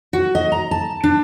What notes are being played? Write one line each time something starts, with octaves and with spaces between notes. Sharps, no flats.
F#4
D#5
A#5
A5
D4